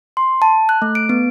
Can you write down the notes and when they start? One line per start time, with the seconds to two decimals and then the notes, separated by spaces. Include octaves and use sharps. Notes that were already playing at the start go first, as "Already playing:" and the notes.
0.17 C6
0.42 A5
0.69 F#6
0.82 A3
0.95 D7
1.09 B3